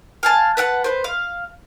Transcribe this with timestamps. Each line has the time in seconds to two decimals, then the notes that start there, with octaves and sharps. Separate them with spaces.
0.23 F5 G#5 A5
0.57 B4 E5 F#5 A5
0.84 B4 C5
1.04 F5